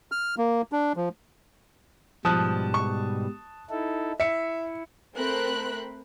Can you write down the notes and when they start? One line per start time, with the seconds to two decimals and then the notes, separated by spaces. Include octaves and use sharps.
0.12 F6
0.38 A#3
0.72 D4
0.96 F3
2.25 G#2 B2 F3 G3 A5 D#6 F#6
2.74 C#6
3.70 D#4 E4 A4
4.20 E4 E5 C#7
5.16 A3 C4 A#4 C5 B5 F#6